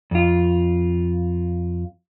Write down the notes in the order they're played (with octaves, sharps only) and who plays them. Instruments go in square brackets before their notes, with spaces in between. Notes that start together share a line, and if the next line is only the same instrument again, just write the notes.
[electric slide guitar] F2 F4